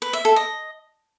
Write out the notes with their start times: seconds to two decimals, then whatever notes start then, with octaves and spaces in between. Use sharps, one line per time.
0.02 B4
0.13 E5
0.25 A4
0.36 D#5